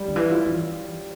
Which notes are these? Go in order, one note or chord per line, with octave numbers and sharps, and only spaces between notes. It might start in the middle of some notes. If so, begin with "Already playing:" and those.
Already playing: G3
D3
E3
F4
E3